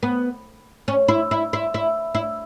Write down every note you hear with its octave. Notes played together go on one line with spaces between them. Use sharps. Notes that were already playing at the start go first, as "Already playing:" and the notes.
B3
C#4
E4
E4
E4
E4
E4